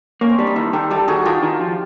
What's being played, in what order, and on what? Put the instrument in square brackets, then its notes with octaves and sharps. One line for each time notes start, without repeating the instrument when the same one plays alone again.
[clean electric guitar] A#3 [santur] C#4
[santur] C4
[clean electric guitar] G3 [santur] D4
[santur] D#4
[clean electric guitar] D#3 [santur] E4
[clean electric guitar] D#3 [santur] G4 A4
[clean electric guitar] G3 [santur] G4 A4
[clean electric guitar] D#3 [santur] F#4 G#4
[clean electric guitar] D#3 [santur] F4 G4
[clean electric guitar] D#3
F3